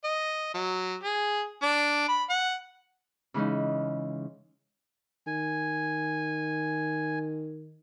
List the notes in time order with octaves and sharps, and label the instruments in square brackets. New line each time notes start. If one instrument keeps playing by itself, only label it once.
[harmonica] D#5
F#3
G#4
D4
B5
F#5
[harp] C#3 E3 G#3 C#4 D#4
[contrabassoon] D#3 [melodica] G#5